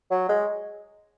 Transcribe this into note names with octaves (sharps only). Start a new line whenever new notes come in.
F#3
G#3